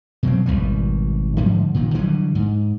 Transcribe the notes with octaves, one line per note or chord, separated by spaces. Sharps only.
B2 F#3 C4
G#1 D#2 B2 G3
G#2 D3 F3 G3
A#2 D#3
D3 E3 F#3 G3
G#2